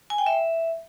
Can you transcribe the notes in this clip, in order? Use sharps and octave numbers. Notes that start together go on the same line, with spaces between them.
G#5
G5
E5